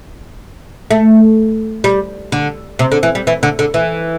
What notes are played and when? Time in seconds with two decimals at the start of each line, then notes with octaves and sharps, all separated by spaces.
0.91 A3
1.84 G3
2.32 D3
2.79 C3
2.92 D3
3.03 E3
3.15 G3
3.27 E3
3.43 D3
3.59 D3
3.74 E3